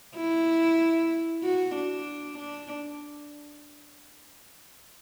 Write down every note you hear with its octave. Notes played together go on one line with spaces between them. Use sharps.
E4
F#4
D4
D4